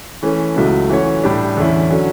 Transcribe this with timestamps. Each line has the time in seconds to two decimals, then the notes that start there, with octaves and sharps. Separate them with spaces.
0.23 E3 A3 C#4
0.56 C#2 B2 F#3 A3 E4
0.90 E3 A3 C#4 F#4 C#5
1.24 A2 G3 D4 G4
1.57 E2 D3 A3 C#4 E4
1.90 D3 F#3 C#4